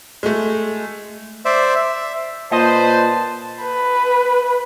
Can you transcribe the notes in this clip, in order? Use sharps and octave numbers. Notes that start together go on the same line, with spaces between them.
G#3 A3
C5 D5 E5
E5
A#2 B4 C5 D#5 A5
B4